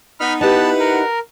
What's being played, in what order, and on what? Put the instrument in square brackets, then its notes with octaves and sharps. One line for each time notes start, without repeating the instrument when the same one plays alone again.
[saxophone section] B3 D#4 [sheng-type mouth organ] B5 F6
[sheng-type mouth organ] B3 A5 [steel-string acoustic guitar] D#4 E4 G4 [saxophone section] B4 F#5
[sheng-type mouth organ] A#4